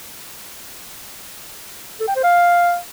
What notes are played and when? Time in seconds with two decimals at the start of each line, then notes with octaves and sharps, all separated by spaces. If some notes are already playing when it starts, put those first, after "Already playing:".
2.00 A4
2.08 G5
2.16 C5
2.24 F5